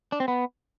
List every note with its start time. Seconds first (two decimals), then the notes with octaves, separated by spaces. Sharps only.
0.12 D4
0.20 C4
0.28 B3